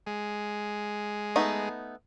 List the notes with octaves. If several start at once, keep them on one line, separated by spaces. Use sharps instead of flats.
G#3
A3 B3 D#4